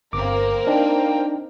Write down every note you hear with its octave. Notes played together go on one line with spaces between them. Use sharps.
G1 A#3 C4 A#4 D6
D4 D#4 G5